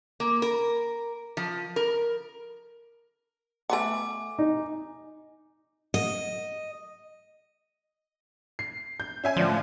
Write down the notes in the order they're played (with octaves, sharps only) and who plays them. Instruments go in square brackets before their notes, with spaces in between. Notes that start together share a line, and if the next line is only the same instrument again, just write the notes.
[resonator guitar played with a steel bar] A#3
A#4
F3
A#4
[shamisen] A3 B3 F#5 [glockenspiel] G#5 D6
[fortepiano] D#4
[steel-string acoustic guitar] D#5
[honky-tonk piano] C7
G6
C#4 E5 G#5
[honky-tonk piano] A2 D3 [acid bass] F3